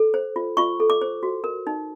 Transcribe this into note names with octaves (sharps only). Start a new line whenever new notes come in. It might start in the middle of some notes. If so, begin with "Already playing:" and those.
Already playing: A4
C5
F4
F4 C#6
A4
D6
C5
F#4
A#4
D#4